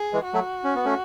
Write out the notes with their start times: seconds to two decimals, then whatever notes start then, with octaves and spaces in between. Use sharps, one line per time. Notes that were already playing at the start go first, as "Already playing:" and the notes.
Already playing: G#4
0.13 E3 G#3
0.24 F#4
0.34 F#3 A3
0.64 C#4
0.75 B3
0.85 A3 C#4